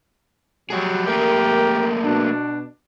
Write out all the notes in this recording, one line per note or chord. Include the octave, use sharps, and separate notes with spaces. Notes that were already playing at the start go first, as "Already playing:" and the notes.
F#3 G3 G#4
A3 A#3 G4 G#4 A#4
B2 D4